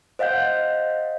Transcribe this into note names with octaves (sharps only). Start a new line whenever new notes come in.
C5 D#5 F5 F#5 G6